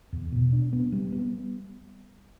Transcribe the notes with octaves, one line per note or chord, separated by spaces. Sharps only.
E2
B2
D4
B3
G3
B3